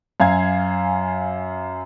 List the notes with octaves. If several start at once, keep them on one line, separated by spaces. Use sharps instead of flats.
F#2 F5 G#5 G#6